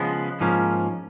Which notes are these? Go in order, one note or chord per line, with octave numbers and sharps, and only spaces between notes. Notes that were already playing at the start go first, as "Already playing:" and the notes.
Already playing: C#3 F3 G#3 B3
G#2 F3 A#3 C#4